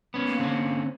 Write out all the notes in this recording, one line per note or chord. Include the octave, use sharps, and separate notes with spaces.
B3 C#4
A#3
D3 C4 C#4